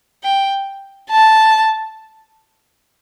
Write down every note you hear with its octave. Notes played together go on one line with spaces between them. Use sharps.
G5
A5